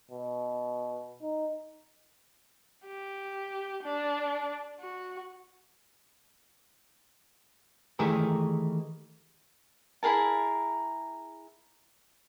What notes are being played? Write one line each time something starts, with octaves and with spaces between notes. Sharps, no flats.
B2
D#4
G4
D4
F#4
D#3 E3 A3 G4 G#4 A#4
E4 G#4 A#4 A5